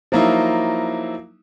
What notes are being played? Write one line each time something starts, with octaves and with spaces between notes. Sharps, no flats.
F3 F#3 A#3 D#4 E4